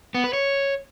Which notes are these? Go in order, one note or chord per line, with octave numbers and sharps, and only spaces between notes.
B3
B4
C#5